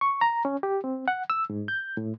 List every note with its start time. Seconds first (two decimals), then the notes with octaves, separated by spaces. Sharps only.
0.01 C#6
0.21 A#5
0.45 C#4
0.63 G4
0.84 C4
1.08 F#5
1.30 E6
1.50 G#2
1.68 G6
1.97 A2